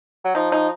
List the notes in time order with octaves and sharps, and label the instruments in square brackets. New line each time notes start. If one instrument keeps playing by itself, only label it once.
[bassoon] F#3
[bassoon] F3 [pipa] D#4
[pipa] D#4